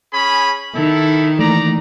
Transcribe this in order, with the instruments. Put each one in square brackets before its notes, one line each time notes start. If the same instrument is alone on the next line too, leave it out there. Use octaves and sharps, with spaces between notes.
[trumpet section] C#4 G#4 B5
[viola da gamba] D#3 [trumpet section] E4 A4
[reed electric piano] E3 A3 A#3 [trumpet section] D5 A#5